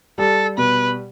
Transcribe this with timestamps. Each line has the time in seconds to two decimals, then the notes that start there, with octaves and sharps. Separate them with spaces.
0.18 G3 A4
0.57 B2 B4